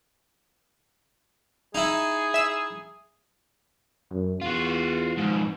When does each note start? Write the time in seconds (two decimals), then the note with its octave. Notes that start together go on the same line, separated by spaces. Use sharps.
1.75 D#4 E4 G#4
2.34 E5 E6 E7
4.11 F#2
4.42 E2 F4 F#4
5.18 F2 G#2